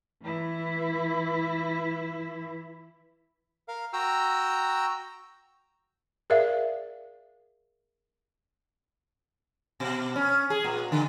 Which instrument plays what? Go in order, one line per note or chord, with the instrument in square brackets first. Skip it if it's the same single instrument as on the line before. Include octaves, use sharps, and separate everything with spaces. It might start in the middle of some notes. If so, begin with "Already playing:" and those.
[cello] E3 E4
[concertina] A#4 F5
F#4 G5 A#5 E6
[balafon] G#4 A#4 D5 E5 F5
[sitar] B2
C#4
G#4
A#2
D3